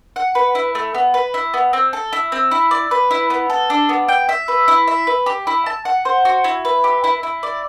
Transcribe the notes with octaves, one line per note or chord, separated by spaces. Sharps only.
F#5
B4
E4
A3
B3
B4
E4
B3
C4
A4
E4
C4
E4
D5
B4
E4
B3
A4
D4
B3
G5
E5
B4
E4
E5
B4
G4
E4
A5
F#5
C5
F#4
E4
B4
G4
E4
E4
D5